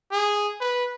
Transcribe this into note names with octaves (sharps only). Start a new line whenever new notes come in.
G#4
B4